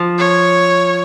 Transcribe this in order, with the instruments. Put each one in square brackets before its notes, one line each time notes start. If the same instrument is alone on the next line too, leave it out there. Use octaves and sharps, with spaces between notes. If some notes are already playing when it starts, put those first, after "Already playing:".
Already playing: [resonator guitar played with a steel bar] F3
[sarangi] C#5